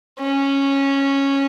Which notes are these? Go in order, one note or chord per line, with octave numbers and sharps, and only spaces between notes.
C#4